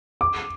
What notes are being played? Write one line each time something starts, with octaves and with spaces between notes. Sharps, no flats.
D6